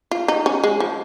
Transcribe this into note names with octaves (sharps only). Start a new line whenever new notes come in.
F4
D#4
C#4
G#3
F3